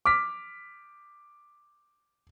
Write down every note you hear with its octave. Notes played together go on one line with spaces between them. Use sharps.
D6 F6 B6